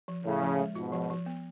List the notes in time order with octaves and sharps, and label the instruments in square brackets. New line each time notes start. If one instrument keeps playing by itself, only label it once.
[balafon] F3
[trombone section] A2 C#3 [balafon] F3
[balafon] F3
G#3
[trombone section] G#2 B2 [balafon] F4
[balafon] F3
F3
B3